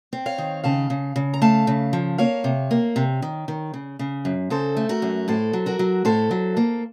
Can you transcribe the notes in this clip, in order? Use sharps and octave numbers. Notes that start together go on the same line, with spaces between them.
C4
C#5 F5
D#3
C#3 F5 A5
C#3
C#3
A#5
A3 F5 A5
C#3
F3
A#3 C#5 F5
C3
A#3
C3
D#3
D#3
C#3
C#3
F#2
C#3 A4 C5
A3
F#4 A#4
F#2
A2 A4 C5
F#3
F#4 A#4
F#3
A2 A4 C5
F#3
A#3